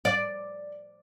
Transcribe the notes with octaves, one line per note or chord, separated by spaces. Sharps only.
D5